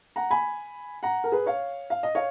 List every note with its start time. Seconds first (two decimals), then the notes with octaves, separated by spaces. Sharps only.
0.16 F#5 A#5
0.31 G#5 B5
1.03 F#5 A#5
1.24 A#4
1.32 G#4 B4
1.46 C#5 F5
1.90 F5
2.03 D#5
2.15 C#5 F5